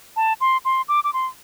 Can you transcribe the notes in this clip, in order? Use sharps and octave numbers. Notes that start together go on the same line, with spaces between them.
A5
C6
C6
D6
D6
C6